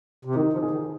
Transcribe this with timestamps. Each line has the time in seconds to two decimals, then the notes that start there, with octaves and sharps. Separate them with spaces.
0.25 C3
0.35 D#3 D#4
0.53 F3
0.62 G#4
0.71 D#3